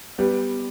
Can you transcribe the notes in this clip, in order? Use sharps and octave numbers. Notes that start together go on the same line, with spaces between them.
G3 B3